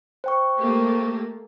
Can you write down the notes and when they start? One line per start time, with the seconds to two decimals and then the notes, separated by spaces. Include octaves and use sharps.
0.24 C5 G5 C#6
0.58 A3 A#3 G4